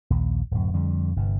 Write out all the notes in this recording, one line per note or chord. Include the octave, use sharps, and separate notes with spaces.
A#1 D#2
D1 F#2
F2 D3 G3
G1 G2 C3